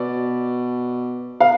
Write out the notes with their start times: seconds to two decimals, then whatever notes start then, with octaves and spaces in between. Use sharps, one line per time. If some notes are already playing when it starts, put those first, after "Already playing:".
Already playing: B2 D5
1.40 F5